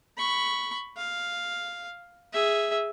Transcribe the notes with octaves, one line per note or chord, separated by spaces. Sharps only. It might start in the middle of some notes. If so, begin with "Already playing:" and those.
B5 C#6
F5
G#4 E5